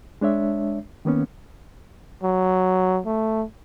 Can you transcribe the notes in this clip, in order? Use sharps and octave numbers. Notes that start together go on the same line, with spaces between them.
G#3 D4 C#5 E5
D#3 A#3 B3 C#4
F#3
A3